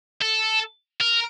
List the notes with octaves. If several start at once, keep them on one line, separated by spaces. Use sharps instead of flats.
A4
A#4